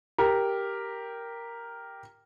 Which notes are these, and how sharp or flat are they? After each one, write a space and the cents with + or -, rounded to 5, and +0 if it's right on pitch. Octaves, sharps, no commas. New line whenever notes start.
G4 +0 A#4 +0